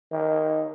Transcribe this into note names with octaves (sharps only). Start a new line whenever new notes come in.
D#3